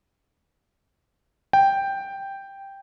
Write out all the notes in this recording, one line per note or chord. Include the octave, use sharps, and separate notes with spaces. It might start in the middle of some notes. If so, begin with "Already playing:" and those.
G5